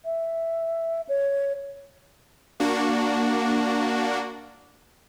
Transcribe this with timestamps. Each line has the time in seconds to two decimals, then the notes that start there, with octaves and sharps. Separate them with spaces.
0.05 E5
1.09 C#5
2.60 A#3 D4 F#4